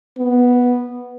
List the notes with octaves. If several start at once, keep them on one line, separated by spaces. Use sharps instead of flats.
B3